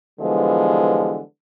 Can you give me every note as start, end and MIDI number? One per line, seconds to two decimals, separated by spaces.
0.20 1.20 50
0.20 1.20 52
0.20 1.20 53
0.20 1.20 55
0.20 1.20 56
0.20 1.20 59